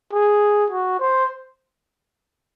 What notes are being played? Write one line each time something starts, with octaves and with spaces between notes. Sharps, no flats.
G#4
F#4
C5